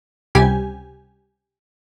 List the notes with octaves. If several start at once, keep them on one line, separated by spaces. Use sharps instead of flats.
C#2 C3 G3 G4 G#5